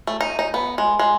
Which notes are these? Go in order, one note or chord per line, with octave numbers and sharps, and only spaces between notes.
A3
D#4
D#4
B3
G#3
G#3